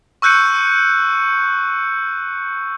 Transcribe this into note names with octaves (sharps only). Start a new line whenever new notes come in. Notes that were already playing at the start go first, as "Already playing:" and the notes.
C#6 E6 F#6 G6 C#7 D#7